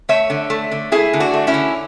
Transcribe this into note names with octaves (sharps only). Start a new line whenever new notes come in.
A3 C#5 E5
D3
A3
D3
A3 E4 G#4
D3
D4 F#4
A3
C#4 E4
D3